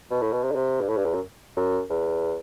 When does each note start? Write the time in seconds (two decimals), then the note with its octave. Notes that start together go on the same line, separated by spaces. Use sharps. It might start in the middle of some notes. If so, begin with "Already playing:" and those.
0.11 B2
0.21 A2
0.32 B2
0.43 C3
0.51 D3
0.55 C3
0.81 G2
0.88 A2
0.97 G2
1.05 E2
1.14 F#2
1.56 F#2
1.90 E2